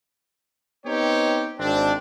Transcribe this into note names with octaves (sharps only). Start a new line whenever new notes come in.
B3 C4 D#4 G4 C#5
G#1 C4 D4